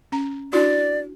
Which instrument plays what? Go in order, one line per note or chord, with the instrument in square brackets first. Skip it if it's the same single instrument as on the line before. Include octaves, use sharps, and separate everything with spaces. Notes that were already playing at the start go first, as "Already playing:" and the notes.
[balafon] C#4 A#5
[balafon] D4 E4 F#4 [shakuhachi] D5